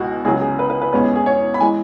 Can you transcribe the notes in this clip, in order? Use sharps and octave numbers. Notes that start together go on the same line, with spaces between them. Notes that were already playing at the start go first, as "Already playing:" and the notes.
Already playing: C#2 B2 G#3 F#4 G#4
C#2 C#3 F#3 G#4
G#4
B4
B4
B4
E2 B2 G#3 C#4 B4
G#4
G#4
C#5
B5
E3 G#3 G#5